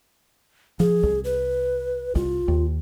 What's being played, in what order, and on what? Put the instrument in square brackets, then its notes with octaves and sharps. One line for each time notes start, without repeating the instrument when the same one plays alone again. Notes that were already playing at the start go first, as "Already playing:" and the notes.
[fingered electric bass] F3 [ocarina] G#4
[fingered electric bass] C2
[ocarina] B4
[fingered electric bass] C2 [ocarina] F4
[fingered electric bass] D#2